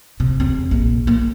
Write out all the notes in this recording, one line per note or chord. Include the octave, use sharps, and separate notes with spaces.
C3
E2 C4
A#1
A#3